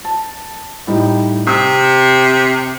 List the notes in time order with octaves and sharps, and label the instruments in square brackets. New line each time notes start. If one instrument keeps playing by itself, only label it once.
[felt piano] A5
A2 G3 D#4
[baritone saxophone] C3 [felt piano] D#6 E6